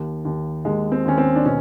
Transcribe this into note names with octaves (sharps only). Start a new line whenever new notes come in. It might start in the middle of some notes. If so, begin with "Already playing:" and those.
Already playing: D#2
D#2
D#2 G#3
C4
D#2 C#4
C4
D4
B2 C#4